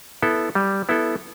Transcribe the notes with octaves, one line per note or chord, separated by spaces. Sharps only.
B3 E4 A4
G3
B3 E4 A4